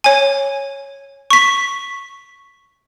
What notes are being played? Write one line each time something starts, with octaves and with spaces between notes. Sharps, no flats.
C#5 G#5
C#6 B6